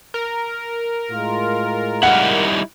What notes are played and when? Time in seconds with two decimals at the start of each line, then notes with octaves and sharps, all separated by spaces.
0.14 A#4
1.10 A2 G#3 F4
2.03 G3 D#4 E4 F#5